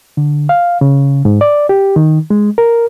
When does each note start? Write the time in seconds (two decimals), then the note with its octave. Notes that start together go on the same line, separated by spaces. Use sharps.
0.17 D3
0.49 F5
0.81 C#3
1.25 G#2
1.41 D5
1.69 G4
1.96 D#3
2.30 G#3
2.58 A#4